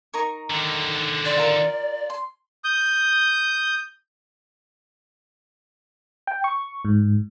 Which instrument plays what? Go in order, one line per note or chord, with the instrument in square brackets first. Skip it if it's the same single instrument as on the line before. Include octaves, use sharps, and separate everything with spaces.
[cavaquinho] D#4 A#4 C#6
[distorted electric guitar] D3 D#3
[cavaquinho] C5 [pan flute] D5
[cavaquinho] F4 A#4
C6
[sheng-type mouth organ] D#6 G6
[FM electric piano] G5
C#6
G#2